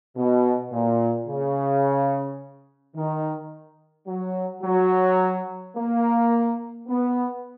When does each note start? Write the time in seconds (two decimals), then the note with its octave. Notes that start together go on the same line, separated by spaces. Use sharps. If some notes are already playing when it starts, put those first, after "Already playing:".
0.16 B2
0.71 A#2
1.27 C#3
2.95 D#3
4.07 F#3
4.63 F#3
5.76 A#3
6.88 B3